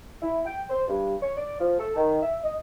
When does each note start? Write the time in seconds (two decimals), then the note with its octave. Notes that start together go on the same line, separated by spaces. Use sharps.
0.22 E4
0.45 G5
0.69 C5
0.88 G2
1.22 C#5
1.37 D5
1.59 F3
1.79 A4
1.96 D#3
2.22 E5
2.44 D#5